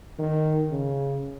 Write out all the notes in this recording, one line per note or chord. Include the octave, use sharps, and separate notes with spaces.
D#3
C#3